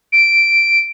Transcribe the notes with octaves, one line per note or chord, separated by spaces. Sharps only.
D7